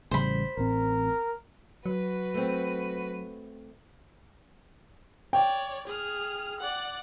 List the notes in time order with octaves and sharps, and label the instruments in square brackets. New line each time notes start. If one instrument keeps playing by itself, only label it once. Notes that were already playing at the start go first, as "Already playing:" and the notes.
[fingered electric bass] A1 C#3 G3 [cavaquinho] C5 B5
[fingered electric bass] A1 A2 C4 [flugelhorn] A#4
[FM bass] F#3 [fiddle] F#4 B4
[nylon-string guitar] A3 C4
[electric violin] C#5 D5 [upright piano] G5
[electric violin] G#4 F6
D5 F#5